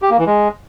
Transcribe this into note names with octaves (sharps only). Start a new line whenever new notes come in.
G4
A#3
E3
G#3